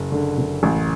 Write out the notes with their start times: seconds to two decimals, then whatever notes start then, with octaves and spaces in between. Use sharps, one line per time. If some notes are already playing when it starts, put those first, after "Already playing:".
Already playing: F#1
0.12 D3
0.38 F#1
0.63 A1